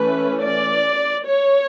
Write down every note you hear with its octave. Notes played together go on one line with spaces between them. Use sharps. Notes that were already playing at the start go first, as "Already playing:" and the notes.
Already playing: E3 A3 C#4 B4
D5
C#5